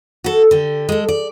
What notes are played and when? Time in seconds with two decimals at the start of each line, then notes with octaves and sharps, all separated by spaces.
0.24 F#4 A4
0.51 D3 G4
0.89 G#3 A4
1.09 D5